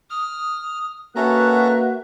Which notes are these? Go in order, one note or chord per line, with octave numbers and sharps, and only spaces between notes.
D#6 F6
A#3 C#4 F#4 A4 B4 E5 A#5 F#6